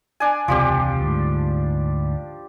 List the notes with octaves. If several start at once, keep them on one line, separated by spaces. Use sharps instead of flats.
D4 G#5
E1 C#2 C3 F3 G3 G4
D2 G#2